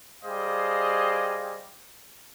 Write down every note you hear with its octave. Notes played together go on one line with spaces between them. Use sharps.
G3 G#4 C5 D#5 F5